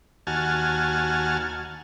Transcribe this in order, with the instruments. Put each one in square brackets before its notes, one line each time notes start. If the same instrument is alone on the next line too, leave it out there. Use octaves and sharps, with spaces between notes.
[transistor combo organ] D#2 F#4 G#5 A5 F6